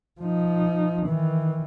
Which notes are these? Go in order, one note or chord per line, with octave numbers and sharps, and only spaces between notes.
F3 D#4
D#3 E3